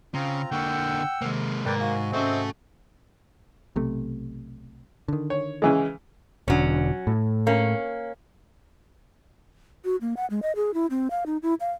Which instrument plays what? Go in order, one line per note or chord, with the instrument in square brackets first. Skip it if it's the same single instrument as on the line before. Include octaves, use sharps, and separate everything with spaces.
[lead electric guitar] C#3 [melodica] C4 F4 A#5
[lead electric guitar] D3 A#3 [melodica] F#5 E6 [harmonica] G5 [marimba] C#6
[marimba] C3 D#3 [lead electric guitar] G#3 A#3
[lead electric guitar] G#2 [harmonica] A#3 [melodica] B4 D5 G5
[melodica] F#4 G#5 [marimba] F5
[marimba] G#2 C#4 [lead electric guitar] A3 A4 [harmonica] C4 D#5 E5
[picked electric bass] B1 C3 A3
D3 D#3
[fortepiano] C#5
C#3 E3 G#3
[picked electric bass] E1 D3 [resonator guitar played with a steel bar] F#3 C#4
[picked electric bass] A2
[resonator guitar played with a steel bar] A#3 C#4
[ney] F#4
A#3
F#5
G#3
D#5
G#4
E4
C4
F5
D#4
E4
F5